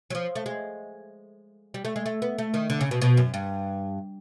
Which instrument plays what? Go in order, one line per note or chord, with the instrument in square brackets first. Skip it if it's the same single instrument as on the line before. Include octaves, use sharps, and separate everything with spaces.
[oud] F#3
F3
A3
G#3
G3
A3
G#3
A3
B3
A3
D#3
D3
C#3
B2
B2
F#2
G2